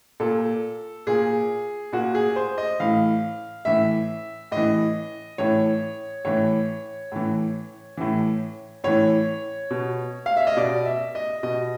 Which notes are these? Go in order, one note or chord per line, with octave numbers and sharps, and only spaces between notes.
A#2 A4
A#2 G#4
A#2 F#4
G#4
C5
D#5
A2 E3 F5
A2 E3 E5
A2 E3 D#5
A2 E3 C#5
A2 E3 C#5
A2 E3
A2 E3
A2 E3 C#5
B2
F5
E5
D#5
B2 D5
E5
D#5
B2 D#5